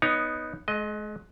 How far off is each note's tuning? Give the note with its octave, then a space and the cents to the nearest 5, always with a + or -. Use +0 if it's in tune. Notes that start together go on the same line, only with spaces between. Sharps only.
B3 +0 D#4 +0 C#5 +15
G#3 +35 D#5 +0